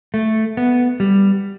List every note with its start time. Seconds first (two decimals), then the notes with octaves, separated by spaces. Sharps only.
0.14 A3
0.57 B3
1.00 G3